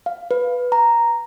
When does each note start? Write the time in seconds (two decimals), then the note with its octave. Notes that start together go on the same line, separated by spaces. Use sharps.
0.06 F5
0.31 B4
0.72 A#5